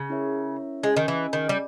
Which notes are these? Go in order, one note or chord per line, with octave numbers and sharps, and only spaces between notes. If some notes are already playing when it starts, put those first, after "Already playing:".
Already playing: C#3
C#4 E4 A#4 C#5 E5
G#3 C#4 G#4 D#5 G#5
D#3
E3
D#3
G3